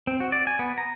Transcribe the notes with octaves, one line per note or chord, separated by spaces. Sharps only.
C4
F#4
D5
G#5
B3
A#5